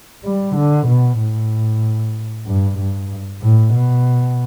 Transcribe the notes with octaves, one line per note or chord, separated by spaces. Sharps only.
G3
D3
B2
A2
G2
G2
A2
B2